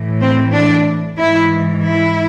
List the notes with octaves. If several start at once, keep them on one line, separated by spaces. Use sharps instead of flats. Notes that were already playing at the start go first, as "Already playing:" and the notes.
Already playing: A2 E3
C4
D4
G#2 E3 E4
E4